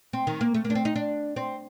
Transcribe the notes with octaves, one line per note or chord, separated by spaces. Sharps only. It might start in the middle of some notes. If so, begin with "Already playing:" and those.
C4
D#3
A#3
A3
A#3
D4
C4
D#4
D4
C4